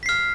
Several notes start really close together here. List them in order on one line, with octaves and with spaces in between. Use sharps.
B6 C7 F6